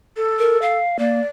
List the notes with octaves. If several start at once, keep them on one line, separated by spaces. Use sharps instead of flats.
A4
A#4
F5
A#3 D5